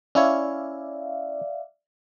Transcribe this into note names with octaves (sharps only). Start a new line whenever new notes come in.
C#4 E4 C#5 D5 E5 F5